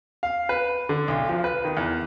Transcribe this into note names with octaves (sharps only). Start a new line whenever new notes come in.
F5
B4
D3
B1
F3
B4
D#3
E2